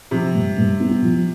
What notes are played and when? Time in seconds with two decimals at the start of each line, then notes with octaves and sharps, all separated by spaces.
0.11 C3 F3
0.35 G2
0.58 G2
0.80 B3
1.02 F3